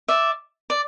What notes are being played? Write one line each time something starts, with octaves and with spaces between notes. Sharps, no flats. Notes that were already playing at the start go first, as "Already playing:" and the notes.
D5 E5
D5